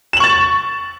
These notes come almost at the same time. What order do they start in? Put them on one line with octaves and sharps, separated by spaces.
E7 F#7 C#6 A6